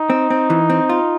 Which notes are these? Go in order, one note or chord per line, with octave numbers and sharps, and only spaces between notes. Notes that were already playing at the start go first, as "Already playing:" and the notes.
Already playing: D#4
C4
C4
E3
C4
F4